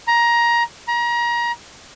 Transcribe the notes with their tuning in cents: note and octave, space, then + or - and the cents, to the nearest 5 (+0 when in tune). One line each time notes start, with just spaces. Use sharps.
A#5 +15
A#5 +30